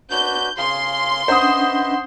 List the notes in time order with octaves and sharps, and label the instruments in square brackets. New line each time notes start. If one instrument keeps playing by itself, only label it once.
[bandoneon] D4 F#4 B4 [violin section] G6
[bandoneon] C#3 G#4 F5 [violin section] C6
[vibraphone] C#4 D4 F#5 [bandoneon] B4 D#5 E5 [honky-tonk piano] C5 D#6